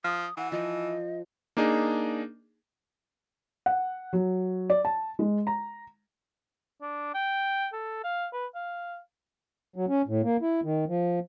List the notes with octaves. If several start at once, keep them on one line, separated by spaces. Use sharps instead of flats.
F3 D#6
E3 F#5
F3 D#5
A#3 D4 D#4 G#4
F#5
F#3
D5
A5
G#3
A#5
D4
G5
A4
F5
B4
F5
F#3
C#4
A2
A#3
E4
D#3
F3